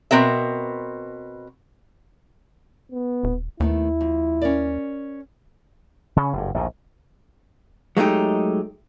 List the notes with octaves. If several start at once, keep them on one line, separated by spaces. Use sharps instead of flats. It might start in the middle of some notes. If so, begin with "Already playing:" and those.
B2 C4 A#4 E5
B3
D#1
D#2 D#3 A3 B3 E4
F2
C#4 A#4 D5
C#3 C#4
F#1 G2
A#1 D#2 A2
F#3 G#3 A3 D#4 G4